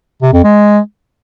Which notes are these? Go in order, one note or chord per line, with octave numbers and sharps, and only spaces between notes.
C3
F2
G#3